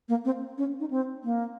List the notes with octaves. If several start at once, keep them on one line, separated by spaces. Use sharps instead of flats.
A#3
C4
C#4
D#4
C4
A#3